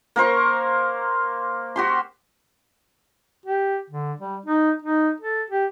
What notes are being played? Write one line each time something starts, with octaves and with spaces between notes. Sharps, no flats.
A#3 A#4 C5 C#6
F#4 G4 C6
G4
D3
G3
D#4
D#4
A4
G4